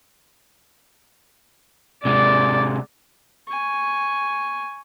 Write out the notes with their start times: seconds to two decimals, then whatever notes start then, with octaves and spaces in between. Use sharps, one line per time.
2.05 C3 G#3 D5
3.48 G#5 C#6